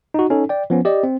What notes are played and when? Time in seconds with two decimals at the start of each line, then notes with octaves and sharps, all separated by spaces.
0.14 D#4 F#4
0.30 C#4 D#4 A4
0.49 D5 G5
0.70 F3 B3 C#4
0.85 G4 D5 D#5
1.03 C4